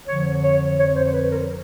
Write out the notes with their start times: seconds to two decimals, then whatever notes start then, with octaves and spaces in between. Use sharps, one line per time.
0.07 F2 D3 F3 C#5
0.43 C#5
0.77 F2 D3 F3 C#5
0.95 C5
1.14 B4
1.31 A#4